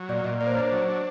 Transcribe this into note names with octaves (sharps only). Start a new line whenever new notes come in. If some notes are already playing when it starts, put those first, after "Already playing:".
Already playing: F#3
A#2 D5
A#2 D#5
A#3 D5
C5
C#5
D4
C5
F#3 C5
D4